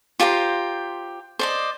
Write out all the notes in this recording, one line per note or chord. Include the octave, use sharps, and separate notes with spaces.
F4 G4 C5 A#5
C5 D5 D#5